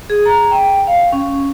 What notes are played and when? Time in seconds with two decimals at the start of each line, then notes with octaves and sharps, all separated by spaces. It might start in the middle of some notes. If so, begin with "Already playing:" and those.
0.10 G#4
0.26 A#5
0.51 G5
0.87 F5
1.13 C#4